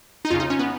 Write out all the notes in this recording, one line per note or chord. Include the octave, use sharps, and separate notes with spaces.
D#4
F2 C#3 F4
D#4
C#4
B3